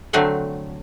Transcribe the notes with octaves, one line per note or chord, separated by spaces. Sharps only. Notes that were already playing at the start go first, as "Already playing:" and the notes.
D3 F#3 A3 C4 E5 F#5